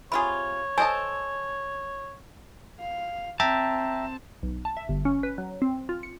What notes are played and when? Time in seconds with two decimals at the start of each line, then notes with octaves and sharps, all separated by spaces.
0.12 C3 F4 G#4 C#5 B5
0.78 A4 C5 D#5 G#5 A5
2.80 F5
3.40 C4 E5 G5 A5 A#5
4.43 B1
4.65 A5
4.77 E5
4.89 G1
5.05 C#4
5.23 B4
5.38 F#3
5.62 C4
5.89 F4
6.03 C#7